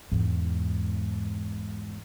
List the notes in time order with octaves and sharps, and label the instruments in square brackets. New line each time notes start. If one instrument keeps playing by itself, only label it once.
[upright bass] E2 G#2